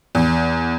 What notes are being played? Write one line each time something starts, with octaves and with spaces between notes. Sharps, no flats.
E2